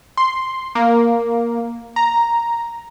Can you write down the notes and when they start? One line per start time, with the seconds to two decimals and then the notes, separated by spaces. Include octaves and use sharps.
0.17 C6
0.75 A#3
1.96 A#5